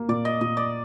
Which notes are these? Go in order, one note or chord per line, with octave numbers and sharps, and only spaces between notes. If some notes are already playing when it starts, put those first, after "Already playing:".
Already playing: A#3
A#2 D5
D#5
A#2 D#5
D5